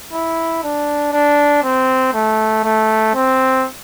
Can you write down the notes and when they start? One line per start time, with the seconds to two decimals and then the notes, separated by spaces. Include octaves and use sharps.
0.13 E4
0.63 D4
1.13 D4
1.63 C4
2.14 A3
2.64 A3
3.14 C4